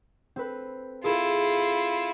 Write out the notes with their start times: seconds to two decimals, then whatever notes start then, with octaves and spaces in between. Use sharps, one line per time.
0.36 C4 A4 B4
1.04 E4 F4 G#4 A4